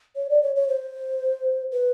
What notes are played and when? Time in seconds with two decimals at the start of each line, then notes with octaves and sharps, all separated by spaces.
0.16 C#5
0.30 D5
0.43 C#5
0.56 C#5
0.69 C5
1.72 B4